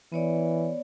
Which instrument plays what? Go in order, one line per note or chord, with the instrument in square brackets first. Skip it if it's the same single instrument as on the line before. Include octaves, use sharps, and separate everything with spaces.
[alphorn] E3 [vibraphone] B3 C#5 D5